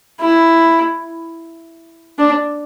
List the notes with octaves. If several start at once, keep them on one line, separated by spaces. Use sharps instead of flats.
E4
D4